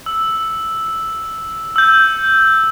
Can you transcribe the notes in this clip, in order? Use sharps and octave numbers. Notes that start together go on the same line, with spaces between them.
E6
E6 G6